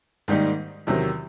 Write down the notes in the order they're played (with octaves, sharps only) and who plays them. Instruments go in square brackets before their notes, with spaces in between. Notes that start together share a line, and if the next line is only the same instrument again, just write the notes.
[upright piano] G#2 D#3 G3 A#3 D#4
E2 C3 D#3 F#3